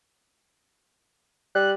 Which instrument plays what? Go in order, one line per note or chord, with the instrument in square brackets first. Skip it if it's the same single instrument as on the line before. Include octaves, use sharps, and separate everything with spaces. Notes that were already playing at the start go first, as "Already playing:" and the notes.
[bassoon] G3 [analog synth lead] F#6